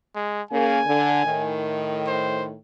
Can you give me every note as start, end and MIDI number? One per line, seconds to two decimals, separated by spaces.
0.15 0.42 56
0.51 0.79 49
0.51 0.79 58
0.51 1.60 80
0.87 1.24 50
1.25 2.55 45
1.25 2.55 51
2.07 2.45 72